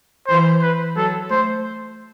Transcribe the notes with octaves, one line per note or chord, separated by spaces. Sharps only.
E3 C5
B4
F#3 A4
A3 C5